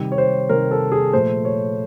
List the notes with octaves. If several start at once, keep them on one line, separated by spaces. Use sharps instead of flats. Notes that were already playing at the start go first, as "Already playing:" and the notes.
Already playing: C3 D#3 G3
C#5
C5
C3 D#3 G3 A#4
A4
G#4
A#2 F3 A3 C5
C#5